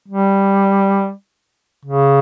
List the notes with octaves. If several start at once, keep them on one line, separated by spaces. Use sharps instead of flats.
G3
C#3